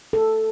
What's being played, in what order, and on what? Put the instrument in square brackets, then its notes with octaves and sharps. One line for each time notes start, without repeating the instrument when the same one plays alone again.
[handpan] A4